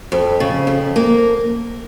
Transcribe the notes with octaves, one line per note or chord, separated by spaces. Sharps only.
F2
C#3
F2
A#3